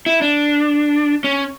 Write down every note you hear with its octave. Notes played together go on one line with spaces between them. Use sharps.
E4
D4
C#4